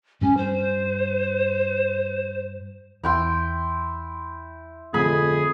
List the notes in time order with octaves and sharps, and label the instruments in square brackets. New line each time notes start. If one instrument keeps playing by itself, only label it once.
[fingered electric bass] G2 G3 [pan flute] C#4
[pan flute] C5
[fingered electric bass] E2 [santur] E4 G5 C6
[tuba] F2 [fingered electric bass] D3 F3 A3 [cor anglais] G#4 [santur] B5